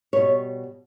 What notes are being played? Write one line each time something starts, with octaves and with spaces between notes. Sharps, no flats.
B2 G3 C#5